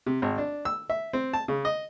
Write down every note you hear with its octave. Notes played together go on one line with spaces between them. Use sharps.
C3
G#1
D4
E6
E5
C4
A5
C#3
D#5